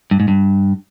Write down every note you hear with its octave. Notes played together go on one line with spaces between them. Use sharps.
G2
G#2
G2